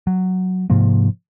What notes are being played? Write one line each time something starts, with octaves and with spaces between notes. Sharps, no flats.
F#3
G#2 C3 F3 A#3